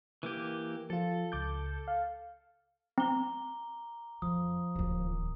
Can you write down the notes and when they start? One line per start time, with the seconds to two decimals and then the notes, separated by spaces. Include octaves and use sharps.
0.23 E3 A#3 G4
0.90 F3 F4 A4
1.32 C#2 D6 G6
1.88 F5
2.98 C4 A#5 D6 G7
4.22 F2 F3 D#6
4.75 D1 D#2